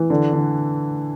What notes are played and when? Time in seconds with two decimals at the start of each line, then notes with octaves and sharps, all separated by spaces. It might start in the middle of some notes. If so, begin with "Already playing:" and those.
Already playing: E3
0.10 D3
0.33 D3